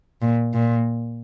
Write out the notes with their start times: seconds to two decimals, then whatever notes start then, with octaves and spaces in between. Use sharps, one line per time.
0.22 A#2
0.54 A#2